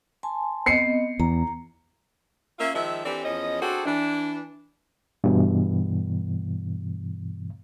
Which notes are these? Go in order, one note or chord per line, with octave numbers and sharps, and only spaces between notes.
G#5 A5 C6
B3 C4 D#5 C7 C#7
E2 A#5
A#3 C#4 F4 E5
D#3 F3 G#3 E5
E3 C4 D4 G4 A4 D5
E2 F3 C#4 D#5
C4 D4 F#4 G#4 A4
E3 D4
G2 B2 E3